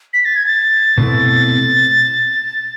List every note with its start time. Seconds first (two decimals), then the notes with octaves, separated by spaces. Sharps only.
0.13 B6
0.25 A6
0.36 G#6
0.46 A6
0.98 B2 A3 C4 E4